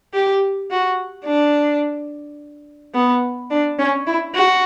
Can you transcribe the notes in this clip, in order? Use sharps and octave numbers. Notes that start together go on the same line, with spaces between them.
G4
F#4
D4
B3
D4
C#4
E4
F#4